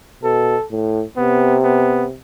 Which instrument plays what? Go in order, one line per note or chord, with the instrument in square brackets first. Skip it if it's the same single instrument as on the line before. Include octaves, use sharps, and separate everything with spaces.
[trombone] B2 [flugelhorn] A4
[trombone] A2
[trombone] C3 [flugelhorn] B3
[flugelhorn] B3